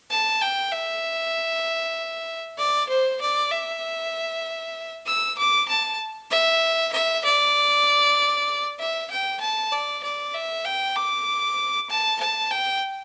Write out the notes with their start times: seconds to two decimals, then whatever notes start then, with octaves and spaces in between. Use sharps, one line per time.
0.11 A5
0.41 G5
0.72 E5
2.58 D5
2.89 C5
3.21 D5
3.52 E5
5.06 E6
5.38 D6
5.69 A5
6.31 E5
6.93 E5
7.25 D5
8.79 E5
9.11 G5
9.41 A5
9.72 D5
10.03 D5
10.35 E5
10.65 G5
10.96 D6
11.90 A5
12.20 A5
12.51 G5